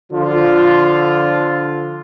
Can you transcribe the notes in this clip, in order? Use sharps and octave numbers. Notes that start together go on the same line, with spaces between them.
D3 F3 F4